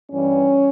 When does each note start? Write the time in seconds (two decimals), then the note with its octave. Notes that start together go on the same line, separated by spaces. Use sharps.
0.10 G2 E3 G3 C#4